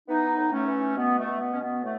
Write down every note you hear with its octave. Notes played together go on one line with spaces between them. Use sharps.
E3 B3 D#4
A2
A3 C#4
E3
B2 B3
A3
B2
B3
B2 C#4
B3
A2 A3